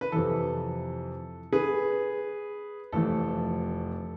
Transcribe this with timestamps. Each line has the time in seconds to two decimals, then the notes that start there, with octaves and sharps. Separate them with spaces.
0.01 B4
0.12 F2 C3 E3 A4
1.53 G#4 B4
2.92 F1 F2 E3 A3 A4